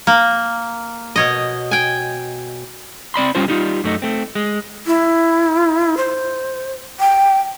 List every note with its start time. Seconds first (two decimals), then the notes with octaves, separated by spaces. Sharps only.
0.07 A#3
1.16 B2 C#5 D#5
1.71 G5 G#5
3.14 C4 D5 B5 C6
3.35 G3 C#4 F4 C5
3.48 G3 D#4 F4
3.84 F#2 A3 D#4
4.02 A3 C4
4.35 G#3
4.87 E4
5.97 C5
7.00 G5